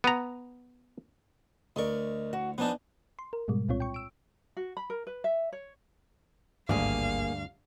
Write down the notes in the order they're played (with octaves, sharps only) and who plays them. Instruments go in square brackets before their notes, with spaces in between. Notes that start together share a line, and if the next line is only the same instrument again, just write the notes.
[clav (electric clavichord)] B3 A#5
[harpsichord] D2 C#6 [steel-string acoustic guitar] A#4 D5 D#5
[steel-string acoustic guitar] F#4
[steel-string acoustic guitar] F3 G#5 A5 [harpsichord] B3 D4 D#4
[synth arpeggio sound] C6
A#4
G#2 B2 G3 G#3
C2 A#2 C4 F4 C#5
G5 C#6
E6 D7
[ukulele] F#4
B5
A#4
B4
E5
C#5
[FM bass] G#1 [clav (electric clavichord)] D2 G2 D5 [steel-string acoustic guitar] A#3 G#4 [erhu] F5